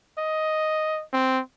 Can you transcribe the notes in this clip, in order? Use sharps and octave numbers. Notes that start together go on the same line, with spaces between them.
D#5
C4